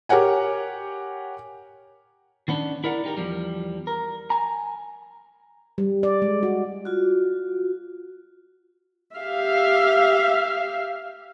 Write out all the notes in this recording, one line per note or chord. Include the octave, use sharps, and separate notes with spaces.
G4 A#4 C#5 F#5 G#5
D#3 B3 C#4 D4
E4 A#4 D5 F#5
D#4 G4 A#4
E2 F3 G3
A#4
G#5 A#5
G3
D5
G#3
F#4
F4 F#4
G4 E5 F5